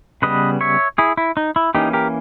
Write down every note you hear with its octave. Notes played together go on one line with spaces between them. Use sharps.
C#3 G3 B3 B4 D#5
C#5 E5
E4 G#4
E4
D#4
E4
E3 A#3 C#4 D#4 G4
G4 A#4